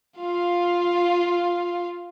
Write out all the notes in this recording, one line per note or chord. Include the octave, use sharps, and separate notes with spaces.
F4 F5